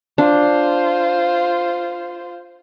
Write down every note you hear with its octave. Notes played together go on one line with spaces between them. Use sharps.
D4 F4 C5